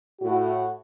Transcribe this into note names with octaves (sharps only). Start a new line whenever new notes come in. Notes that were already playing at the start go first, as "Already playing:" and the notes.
A2 F#4